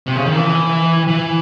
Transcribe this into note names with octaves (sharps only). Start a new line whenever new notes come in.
C3
C#3
D#3
E3
E3